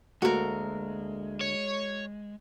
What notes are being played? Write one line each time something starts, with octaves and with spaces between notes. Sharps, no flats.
D2 G#3 A#3 F#4 A4 A#4
C#5